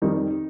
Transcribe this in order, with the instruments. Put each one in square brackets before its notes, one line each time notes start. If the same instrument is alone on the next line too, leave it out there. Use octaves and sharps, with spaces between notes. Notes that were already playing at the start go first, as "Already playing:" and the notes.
[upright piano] F2 D#3 G3 D#4